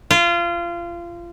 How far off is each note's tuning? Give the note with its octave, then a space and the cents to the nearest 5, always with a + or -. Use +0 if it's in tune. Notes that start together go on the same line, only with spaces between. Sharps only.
F4 -25